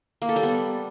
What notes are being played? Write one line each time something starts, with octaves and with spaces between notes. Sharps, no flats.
A#3
A4
G3
B3